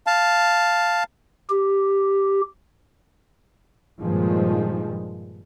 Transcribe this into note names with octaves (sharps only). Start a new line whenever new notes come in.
F5 A5
G4
G2 A#2 D#3 F3 G#3